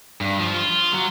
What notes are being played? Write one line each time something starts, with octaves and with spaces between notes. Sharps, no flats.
G2
F3
F4
F#3